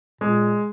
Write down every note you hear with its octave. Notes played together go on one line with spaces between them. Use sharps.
A#2 G#3